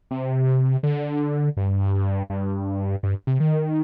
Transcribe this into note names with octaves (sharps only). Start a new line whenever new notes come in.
C3
D3
G2
G2
G2
C3
D#3